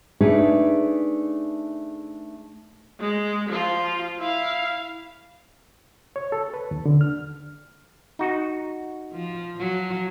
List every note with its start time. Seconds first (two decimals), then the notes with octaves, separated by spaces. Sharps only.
0.21 A3 D4 D#4 G#4 B4
3.00 G#3
3.49 F3 F4
4.18 E4 F5
6.16 C#5
6.32 A4
6.54 B4
6.71 D#2
6.86 D3
7.01 F6
8.19 D#4 F#4
9.12 F3
9.58 F3 F#3